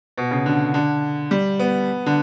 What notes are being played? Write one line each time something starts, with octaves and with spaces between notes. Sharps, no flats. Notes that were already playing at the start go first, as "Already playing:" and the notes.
B2
C#3
D3
D3
G3
B3
D3